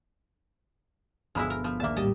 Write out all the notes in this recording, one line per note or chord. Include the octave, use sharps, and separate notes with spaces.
G1 B2 F3 G#3 E4 B5
A#4
F3
A#1 D#2 A#3 E5 A5
A2 G3 G4 D#5 A5